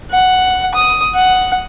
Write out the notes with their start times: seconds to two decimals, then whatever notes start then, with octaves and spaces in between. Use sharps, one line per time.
0.11 F#5
0.74 D#6
1.15 F#5